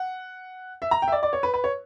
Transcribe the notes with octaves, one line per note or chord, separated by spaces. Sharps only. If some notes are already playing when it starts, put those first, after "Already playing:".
Already playing: F#5
E5
A#5
G5
E5
D5
D5
C#5
B4
B4
C#5